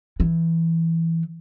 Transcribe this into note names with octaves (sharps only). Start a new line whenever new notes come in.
E3